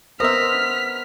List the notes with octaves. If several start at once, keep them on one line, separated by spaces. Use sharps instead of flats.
B3 A#4 C5 D#5 E5 F6 B6